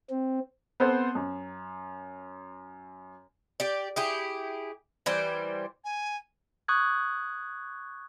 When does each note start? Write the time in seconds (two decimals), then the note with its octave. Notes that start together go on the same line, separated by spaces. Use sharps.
0.10 C4
0.80 B3 C4 A4 C5
1.15 F#2
3.60 G4 D5
3.96 E4 G4 G#4
5.06 E3 G3 C5
5.85 G#5
6.68 C#6 D#6 F#6 G#6